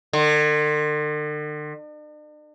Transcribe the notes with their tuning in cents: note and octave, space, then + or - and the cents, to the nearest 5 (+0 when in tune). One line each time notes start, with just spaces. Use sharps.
D3 +45